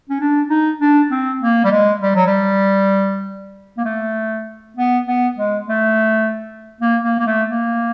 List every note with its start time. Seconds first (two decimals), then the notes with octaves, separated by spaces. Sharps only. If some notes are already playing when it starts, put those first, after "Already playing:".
0.09 C#4
0.21 D4
0.50 D#4
0.80 D4
1.11 C4
1.42 A#3
1.64 G3
1.71 G#3
2.02 G3
2.15 F#3
2.27 G3
3.78 A#3
3.85 A3
4.77 B3
5.06 B3
5.38 G#3
5.68 A3
6.81 A#3
7.04 A#3
7.19 A#3
7.27 A3
7.50 A#3